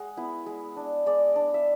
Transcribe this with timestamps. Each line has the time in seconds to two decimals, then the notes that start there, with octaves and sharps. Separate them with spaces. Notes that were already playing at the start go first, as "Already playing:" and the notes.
Already playing: G#3 F#5
0.17 B3 E4
0.46 G#3
0.76 D4
1.06 G#3 D5
1.36 D4
1.54 E5